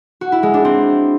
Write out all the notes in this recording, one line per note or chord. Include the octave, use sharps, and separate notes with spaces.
F#4
E4
G#3
D4
C4